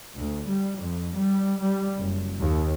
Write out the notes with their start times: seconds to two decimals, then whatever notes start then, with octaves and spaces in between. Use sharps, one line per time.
0.16 D2
0.47 G3
0.79 F2
1.15 G3
1.60 G3
1.98 F#1
2.41 D#2